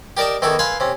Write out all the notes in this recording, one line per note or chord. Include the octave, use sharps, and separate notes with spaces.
G4 A#4 D5 D#5 A5
E2 D#3 E3 D#4 A4 C#6
B4 F5 G#5 B5 C6
C3 C#4